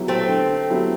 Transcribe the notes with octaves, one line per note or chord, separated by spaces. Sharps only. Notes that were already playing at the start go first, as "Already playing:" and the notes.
Already playing: F#3 B3 E4 G4
A3 C4
D3
F#3 B3 E4 G4